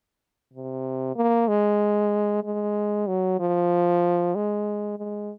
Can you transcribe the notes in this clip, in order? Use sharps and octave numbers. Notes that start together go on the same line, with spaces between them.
C3
A#3
G#3
G#3
F#3
F3
G#3
G#3